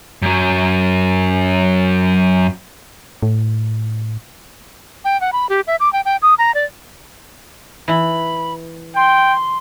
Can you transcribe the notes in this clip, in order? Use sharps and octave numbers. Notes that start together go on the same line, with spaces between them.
F#2 F#3
A2
G5
F#5
B5
G4
E5
D6
G5
G5
D#6
A#5
D5
E3 E4 B5
G5 C6